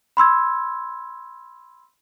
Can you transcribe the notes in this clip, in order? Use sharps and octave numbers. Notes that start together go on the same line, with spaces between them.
B5 C6 E6 G#6